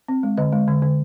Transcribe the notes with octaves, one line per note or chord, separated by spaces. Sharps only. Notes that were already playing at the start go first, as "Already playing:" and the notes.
C4
G#3
D3 D#5
G#3
D3
D3